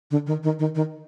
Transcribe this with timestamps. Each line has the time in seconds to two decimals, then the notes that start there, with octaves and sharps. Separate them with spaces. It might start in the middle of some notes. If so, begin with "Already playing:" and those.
0.11 D3
0.27 D#3
0.43 D#3
0.59 D#3
0.75 D#3